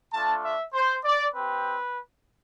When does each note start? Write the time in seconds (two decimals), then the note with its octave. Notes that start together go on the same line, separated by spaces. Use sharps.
0.12 A3 D4 F4 A5
0.43 E5
0.74 C5
1.04 D5
1.34 C4 G4 B4